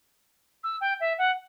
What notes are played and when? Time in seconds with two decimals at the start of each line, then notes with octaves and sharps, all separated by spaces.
0.64 E6
0.81 G5
1.00 E5
1.18 F#5